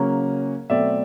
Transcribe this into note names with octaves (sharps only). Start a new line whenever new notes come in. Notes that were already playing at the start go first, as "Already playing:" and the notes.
Already playing: C#3 F#3 A#3 C#4
B2 F#3 A3 C4 D5 E5